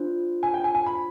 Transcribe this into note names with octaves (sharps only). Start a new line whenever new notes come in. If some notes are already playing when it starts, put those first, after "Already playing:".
Already playing: D4 F4 C5
G#5
G5
G#5
G#5
B5